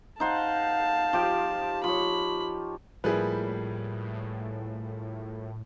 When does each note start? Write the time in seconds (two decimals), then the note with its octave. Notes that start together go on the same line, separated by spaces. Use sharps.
0.20 D#4 C5 F5 F#5 A5
1.13 F3 G4 G5
1.84 F3 C#5 B5
3.04 A2 F3 G3 A#3 E4 G#4 B4